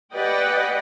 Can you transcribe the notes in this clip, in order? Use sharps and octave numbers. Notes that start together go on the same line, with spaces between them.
G4 B4 D5 D#5 F#5 G5